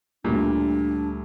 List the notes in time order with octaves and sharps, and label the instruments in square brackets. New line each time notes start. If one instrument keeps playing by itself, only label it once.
[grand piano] D2 G3 [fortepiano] A#2 [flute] D4